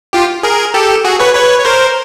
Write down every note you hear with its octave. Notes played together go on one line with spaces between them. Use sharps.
F4 G4
G#4 A#4
G4 A4
F#4 G#4
B4 C#5
B4 C#5
C#5
A#4 C5